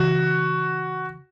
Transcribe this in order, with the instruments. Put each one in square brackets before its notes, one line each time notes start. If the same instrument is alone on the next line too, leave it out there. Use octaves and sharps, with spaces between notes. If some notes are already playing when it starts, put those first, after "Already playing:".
Already playing: [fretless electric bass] C#3 E3 [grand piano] F#4